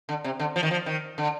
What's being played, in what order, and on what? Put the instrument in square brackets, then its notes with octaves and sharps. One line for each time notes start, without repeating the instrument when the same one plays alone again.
[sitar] D3
C3
D3
F3
D#3
F3
D#3
D3